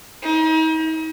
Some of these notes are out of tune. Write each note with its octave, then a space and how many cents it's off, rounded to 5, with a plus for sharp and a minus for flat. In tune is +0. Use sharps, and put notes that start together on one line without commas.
D#4 +40